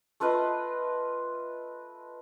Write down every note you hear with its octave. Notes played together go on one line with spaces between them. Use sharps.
A3 F4 B4 D#5